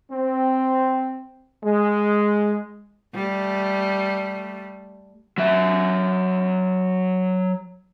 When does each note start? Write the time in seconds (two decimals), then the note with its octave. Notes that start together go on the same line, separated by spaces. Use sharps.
0.11 C4
1.64 G#3
3.15 G3 A3
5.38 F#3 E5